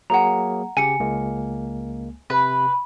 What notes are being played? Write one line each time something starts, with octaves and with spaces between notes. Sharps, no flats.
F#3 A#3 G#4 F#5 A#5
C#3 G4 G#5 C#7
C#2 G#3 A#3
C3 B4